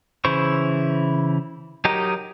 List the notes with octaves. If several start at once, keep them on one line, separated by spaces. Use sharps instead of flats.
C#3 E3 E4 C5 C#6
F#3 D#4 G4 A#4 D#5